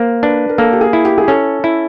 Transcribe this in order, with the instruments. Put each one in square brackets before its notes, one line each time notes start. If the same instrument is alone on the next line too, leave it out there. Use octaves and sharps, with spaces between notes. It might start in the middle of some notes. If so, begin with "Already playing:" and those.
Already playing: [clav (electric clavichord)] A#3 [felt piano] C5
[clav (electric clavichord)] D4 [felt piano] B4
[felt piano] A#4
[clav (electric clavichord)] A#3 [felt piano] A4
[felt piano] G4
G#4
[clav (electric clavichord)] E4
[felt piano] G4
G#4
[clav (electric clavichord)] C#4 [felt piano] A4
[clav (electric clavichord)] E4